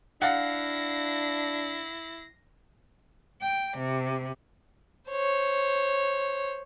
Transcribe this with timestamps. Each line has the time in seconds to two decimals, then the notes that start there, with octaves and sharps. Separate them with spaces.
0.22 D4 E4 F5 F#5 A#6 C7
3.41 G5
3.78 C3
5.09 C5 C#5